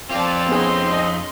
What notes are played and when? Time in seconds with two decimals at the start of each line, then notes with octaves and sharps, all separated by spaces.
0.11 F2 C4 F4 D5 A5
0.49 B3 C#4 D#4 G#4 C6
0.93 D#5